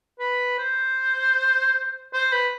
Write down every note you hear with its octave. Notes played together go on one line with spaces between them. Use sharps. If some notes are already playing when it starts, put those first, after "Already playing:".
B4
C5
C5
B4